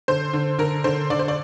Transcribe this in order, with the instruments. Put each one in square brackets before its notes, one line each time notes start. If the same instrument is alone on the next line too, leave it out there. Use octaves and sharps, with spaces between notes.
[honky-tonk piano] D3 C5
D3
D3 A#4
D3 C5
D3 D5
C5
D5